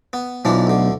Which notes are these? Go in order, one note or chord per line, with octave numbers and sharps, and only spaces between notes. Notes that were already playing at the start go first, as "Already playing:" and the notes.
B3
B1 E3 F3 D4
D2 D3